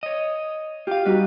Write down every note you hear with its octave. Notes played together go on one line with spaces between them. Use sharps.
C#5 D#5
F4 G4 F5
G3 D#4 F#4 B4